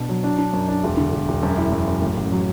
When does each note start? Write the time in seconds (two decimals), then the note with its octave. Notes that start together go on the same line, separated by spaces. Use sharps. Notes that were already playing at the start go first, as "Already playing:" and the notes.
Already playing: B2 D4
0.09 F#3
0.24 D4
0.38 D4
0.53 F#2
0.68 D4
0.84 E1
0.97 D3
1.12 E1
1.28 E1
1.43 F#2
1.58 E4
1.72 F#2
1.87 F#2
2.02 A1
2.17 A1
2.32 F#3